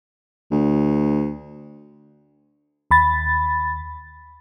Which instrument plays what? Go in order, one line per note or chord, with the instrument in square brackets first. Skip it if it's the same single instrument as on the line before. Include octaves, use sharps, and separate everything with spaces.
[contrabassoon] D2
[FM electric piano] D#2 B5 A6